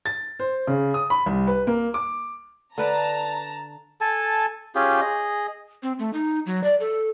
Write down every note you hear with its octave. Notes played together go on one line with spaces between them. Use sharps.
A6
C5
C#3
D#6
B5
C2
B4
A#3
D6
D3 B4 D5 A5 A#5
A4 G#5 A5
C#4 F4 G4 G#4
G#4 D#5
C4
A3
D#4
F#3
D5
A4